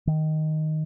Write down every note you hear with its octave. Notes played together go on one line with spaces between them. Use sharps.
D#3